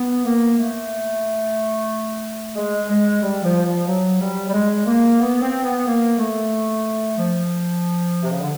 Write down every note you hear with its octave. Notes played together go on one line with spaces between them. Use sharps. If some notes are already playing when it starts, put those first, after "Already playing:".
Already playing: B3
A#3
A3
G#3
G#3
G3
F3
F3
F#3
G3
G3
G#3
A#3
B3
C4
B3
A#3
A3
F3
C3
C#3
D3